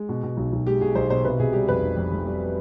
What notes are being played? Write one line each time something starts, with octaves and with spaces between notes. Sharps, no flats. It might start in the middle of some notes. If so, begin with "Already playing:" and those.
Already playing: G#3
B2
B2
B1
B1
G#3 G4
B2 G#4
B1 C5
B2 C5
C3 B4
C3 G#4
G3 G4
F2 B4
F1
F2
F2
G3